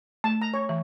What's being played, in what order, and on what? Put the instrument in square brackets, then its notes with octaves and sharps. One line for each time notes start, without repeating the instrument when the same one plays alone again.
[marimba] A3 [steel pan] A5
[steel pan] A#5
C#5
[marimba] E3